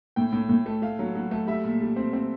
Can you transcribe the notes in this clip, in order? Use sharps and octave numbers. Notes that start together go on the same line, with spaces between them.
A2 G5
A2
A2
A3
A3 F5
F#3
F#3
A3
G3 E5
A#2
G3
C4
C4